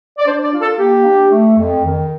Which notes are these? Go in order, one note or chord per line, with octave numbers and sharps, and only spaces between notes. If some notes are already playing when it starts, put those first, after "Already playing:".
D5
D4 C5
D5
F4
A4
A#3 G4
D4
A3
F2
D#3